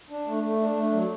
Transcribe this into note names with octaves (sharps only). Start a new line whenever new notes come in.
D4
A3
A3
D4
A3
F#3